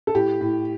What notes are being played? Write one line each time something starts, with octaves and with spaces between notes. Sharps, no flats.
A4
A2 G4
A2